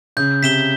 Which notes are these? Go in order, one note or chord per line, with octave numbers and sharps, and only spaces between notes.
C#3 G6
C3 B6 E7 G7